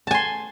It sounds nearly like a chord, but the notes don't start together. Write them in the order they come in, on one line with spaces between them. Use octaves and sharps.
A5 G#5 C6